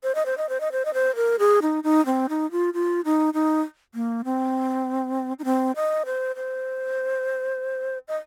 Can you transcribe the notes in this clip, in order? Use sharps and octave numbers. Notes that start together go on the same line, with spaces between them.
C5
D#5
C5
D#5
C5
D#5
C5
D#5
C5
A#4
G#4
D#4
D#4
C4
D#4
F4
F4
D#4
D#4
A#3
C4
D#4
C4
D#5
C5
C5
D#5